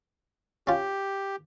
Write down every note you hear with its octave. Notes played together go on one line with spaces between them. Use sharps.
C#4 F4 G4